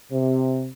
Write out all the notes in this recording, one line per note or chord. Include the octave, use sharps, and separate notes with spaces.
C3